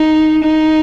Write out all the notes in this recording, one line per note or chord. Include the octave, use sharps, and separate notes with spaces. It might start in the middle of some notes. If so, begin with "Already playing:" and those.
Already playing: D#4
D#4